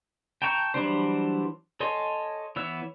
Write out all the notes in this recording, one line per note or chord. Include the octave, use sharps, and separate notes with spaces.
G5 A5 A#5 C#6 G6
E3 F#3 G3 D4 C5
A4 C#5 D#5 G#5 C6
E3 B3 C#5 E6